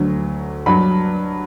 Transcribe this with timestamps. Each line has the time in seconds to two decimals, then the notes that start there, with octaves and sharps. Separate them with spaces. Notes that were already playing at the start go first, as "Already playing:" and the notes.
Already playing: D2 D3 F#3
0.66 G2 F#3 B5